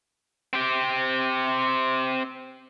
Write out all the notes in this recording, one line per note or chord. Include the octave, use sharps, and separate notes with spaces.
C4 G4